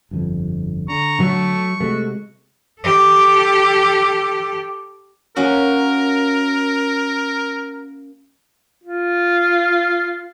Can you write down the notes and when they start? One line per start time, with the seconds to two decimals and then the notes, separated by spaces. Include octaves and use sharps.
0.11 G1 F2
0.89 D3 A#5 C#6
1.20 F#3 A3
1.80 C3 G#3 A3 F#4
2.81 G4 A4
5.36 A#3 C#4 F#4 A#4
8.84 F4